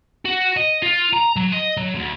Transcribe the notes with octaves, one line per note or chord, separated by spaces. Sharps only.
F#4
D#5
F4
A#5
F#3
D#5
F#3
D2